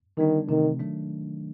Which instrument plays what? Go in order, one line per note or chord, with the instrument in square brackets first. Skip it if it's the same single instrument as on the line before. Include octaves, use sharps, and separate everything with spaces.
[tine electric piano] D3 G3 B3 D4 [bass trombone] D#3
[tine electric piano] C3 E3 A3 C4 [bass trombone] D#3
[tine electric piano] D#3 F#3 A3 D4